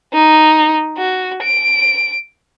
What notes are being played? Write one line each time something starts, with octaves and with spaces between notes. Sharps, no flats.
D#4
F#4
D7